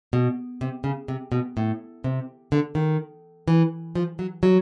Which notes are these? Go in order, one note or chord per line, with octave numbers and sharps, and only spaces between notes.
B2
C3
C#3
C3
B2
A2
C3
D3
D#3
E3
F3
F#3
F#3